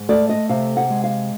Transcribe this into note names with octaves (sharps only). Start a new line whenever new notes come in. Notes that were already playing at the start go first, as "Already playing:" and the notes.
Already playing: G#2
A3 D5
D#5
C3 F5
F#5
G#3
F5